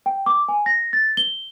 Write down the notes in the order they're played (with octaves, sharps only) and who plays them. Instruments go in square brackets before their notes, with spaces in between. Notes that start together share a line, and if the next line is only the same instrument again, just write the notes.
[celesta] G5
D6
G#5
A#6
A6
G7